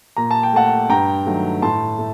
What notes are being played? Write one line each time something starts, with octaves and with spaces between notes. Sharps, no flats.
A#2 A#5
A5
G5
A3 F#5 A5
G2 G5 A#5
D#3 F#3 A3
A2 A5 C6
A3